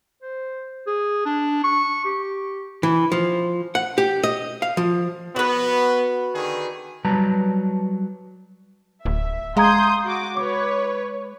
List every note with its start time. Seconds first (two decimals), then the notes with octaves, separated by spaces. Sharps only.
0.22 C5
0.87 G#4
1.25 D4
1.64 C#6
2.05 G4
2.83 E3
3.12 F3
3.75 F#5
3.98 G4
4.23 D#5
4.62 F5
4.77 F3
5.36 B3 F#4 B4
6.35 D3 D#3 G#4
7.05 F#3 G3 B4 A5 A#5
9.05 D1 E5
9.57 G#3 F5 A#5 C6 D#6 G6 G#6
10.04 F#4 D6
10.37 B4 C#5 D6